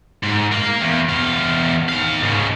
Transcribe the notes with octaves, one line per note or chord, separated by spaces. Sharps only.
G#2
A#4 F5
E2
E2 F5
D#3 F5
G#2 C#3